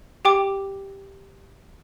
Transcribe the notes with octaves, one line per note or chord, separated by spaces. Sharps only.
G4 G5 D6